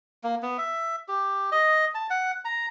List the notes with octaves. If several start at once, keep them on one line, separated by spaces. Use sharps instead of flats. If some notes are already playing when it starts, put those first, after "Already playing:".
A#3
B3
E5
G4
D#5
A5
F#5
A#5